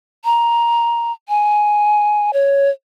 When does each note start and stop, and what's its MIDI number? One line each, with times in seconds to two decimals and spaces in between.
0.25 1.12 82
1.29 2.31 80
2.33 2.70 73